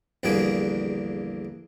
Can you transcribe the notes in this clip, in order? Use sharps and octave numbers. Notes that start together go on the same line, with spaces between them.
A#1 E2 D3 G3 A#3 G#4